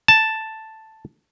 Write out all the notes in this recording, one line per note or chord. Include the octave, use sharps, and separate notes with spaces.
A5